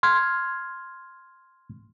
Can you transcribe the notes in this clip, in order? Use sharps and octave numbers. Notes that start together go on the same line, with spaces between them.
C6 F6 G#6